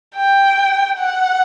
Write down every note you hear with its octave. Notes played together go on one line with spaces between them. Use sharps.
G5
F#5